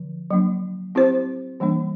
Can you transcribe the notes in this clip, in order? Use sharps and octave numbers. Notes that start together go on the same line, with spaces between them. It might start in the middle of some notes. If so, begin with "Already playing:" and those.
Already playing: D3 F3
F#3 A#3 D4
C4 E4 G4 C5
E3 G3 A#3 D4